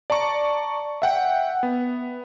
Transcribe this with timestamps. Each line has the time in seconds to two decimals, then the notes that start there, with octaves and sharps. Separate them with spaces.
0.10 D5 A5 A#5 C#6
1.02 E5 F#5 G5
1.63 B3